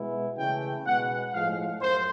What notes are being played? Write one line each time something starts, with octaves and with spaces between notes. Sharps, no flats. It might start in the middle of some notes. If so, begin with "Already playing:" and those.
Already playing: B2 G#3 B3 E4
C#3 E3 A3 G5
B2 G#3 B3 F#5
A2 F3 G#3 F5
F#2 C5